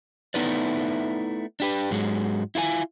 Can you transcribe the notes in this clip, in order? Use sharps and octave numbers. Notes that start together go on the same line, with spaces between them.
A3 B3 D#4 E4 B4 D5
D4 G4 B4
G#2 F#3 G#3
E4 F4 B4 G#5